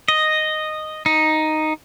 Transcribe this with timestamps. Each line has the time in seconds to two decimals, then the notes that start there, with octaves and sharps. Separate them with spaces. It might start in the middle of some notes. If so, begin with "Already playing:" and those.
0.08 D#5
1.06 D#4